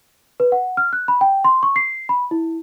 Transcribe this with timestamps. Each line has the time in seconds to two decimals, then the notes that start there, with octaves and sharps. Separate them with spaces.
0.40 B4
0.52 F#5
0.77 F6
0.93 F#6
1.08 B5
1.21 G5
1.44 C6
1.63 C#6
1.76 C7
2.09 B5
2.31 E4